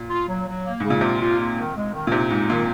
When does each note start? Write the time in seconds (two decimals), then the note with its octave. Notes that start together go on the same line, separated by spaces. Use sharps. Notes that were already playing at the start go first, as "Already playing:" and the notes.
Already playing: A#2
0.09 F4
0.28 F#3
0.46 F#3
0.64 A#3
0.80 G#2 C#3
0.90 A#2
1.01 C3 F4
1.20 F4
1.39 A#3
1.57 D#3
1.75 G#3
1.93 D#3
2.07 A#2
2.12 C3 D#4
2.30 G#2 D#4
2.49 A#2 D#3